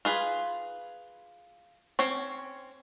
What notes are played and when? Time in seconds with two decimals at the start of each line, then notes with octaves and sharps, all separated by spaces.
0.05 F4 G#4 B4
1.99 C4 C#4 C#5